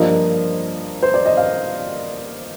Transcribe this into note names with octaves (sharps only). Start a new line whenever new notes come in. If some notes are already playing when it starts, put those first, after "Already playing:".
Already playing: G2 F3 A#3 D#5
C5
D5
D#5
F5